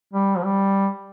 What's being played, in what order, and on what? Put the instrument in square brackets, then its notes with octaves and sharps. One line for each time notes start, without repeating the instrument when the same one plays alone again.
[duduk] G3
F3
G3